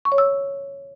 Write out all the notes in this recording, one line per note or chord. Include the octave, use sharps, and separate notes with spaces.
C#6
C#5
E6